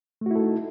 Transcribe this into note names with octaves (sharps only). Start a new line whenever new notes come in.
A3 D#4 E4 F#4 A4